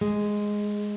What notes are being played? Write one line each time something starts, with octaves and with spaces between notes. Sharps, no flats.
G#3